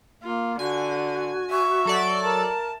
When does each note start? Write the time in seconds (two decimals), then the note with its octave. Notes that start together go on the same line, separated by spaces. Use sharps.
0.23 A#3 F4
0.59 D3 F#4 G#5
1.51 E5 C#6
1.85 F#3 A4 D5
2.23 A#4 A5